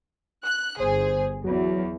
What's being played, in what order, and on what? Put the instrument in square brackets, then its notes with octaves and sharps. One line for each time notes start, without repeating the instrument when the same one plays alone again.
[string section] F#6
[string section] G1 G#4 [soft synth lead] C5
[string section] E2 [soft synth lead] F#3